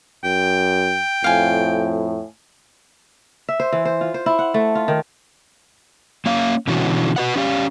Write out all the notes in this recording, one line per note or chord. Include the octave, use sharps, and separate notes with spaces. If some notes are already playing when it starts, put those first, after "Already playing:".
F#2 G5
F2 A2 F5 G#5
E5
C5
E3
C5
F4
C5
E4
F#5
A3
F4
D#3
A#3 C#4 F5
B2 D3 E3 C#4 F#4
F#4 B4 F#5
C#4 G4 F5